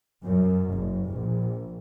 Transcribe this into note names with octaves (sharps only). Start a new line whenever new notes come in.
F#2
F#1
A#1